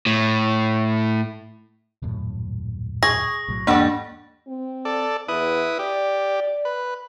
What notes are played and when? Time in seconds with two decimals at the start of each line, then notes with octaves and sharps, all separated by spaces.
0.06 A2
2.02 D#1 F#2 A2
3.03 G#4 C#6 A#6
3.48 B1 A2 F#3
3.67 E2 G#2 G3 A#3 D4 A4 D5 F#5
4.47 C4
4.85 A4 D5
5.29 E2 E4 B4 D#6
5.79 G4 D5
6.65 B4